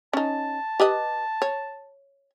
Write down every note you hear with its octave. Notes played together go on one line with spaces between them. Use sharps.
C#4 D#4 A5
G4 B4 D#5
C#5